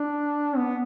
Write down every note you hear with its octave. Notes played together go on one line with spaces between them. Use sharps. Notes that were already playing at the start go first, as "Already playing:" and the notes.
Already playing: D4
B3